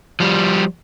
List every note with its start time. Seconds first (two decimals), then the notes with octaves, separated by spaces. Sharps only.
0.20 F3 G3